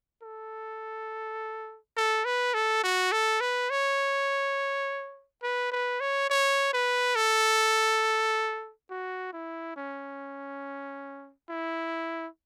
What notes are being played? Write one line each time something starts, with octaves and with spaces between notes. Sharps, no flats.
A4
A4
B4
A4
F#4
A4
B4
C#5
B4
B4
C#5
C#5
B4
A4
F#4
E4
C#4
E4